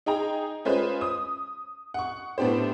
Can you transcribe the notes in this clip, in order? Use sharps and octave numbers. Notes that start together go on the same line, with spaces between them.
D#4 G#4 G5 A#5
G#3 C#4 F4 G#4 B4 C5
D#6
F#5 C#6
A2 B3 D4 G4 C5